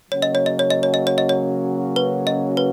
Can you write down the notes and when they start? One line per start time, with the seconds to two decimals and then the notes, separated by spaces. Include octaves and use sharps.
0.11 C#3 F#3 A#3 C#4 F#4 C#5
0.22 D#5
0.35 C#5
0.46 D#5
0.59 C#5
0.70 D#5
0.83 C#5
0.94 D#5
1.07 C#5
1.18 D#5
1.29 C#5
1.96 B4
2.27 D#5
2.57 B4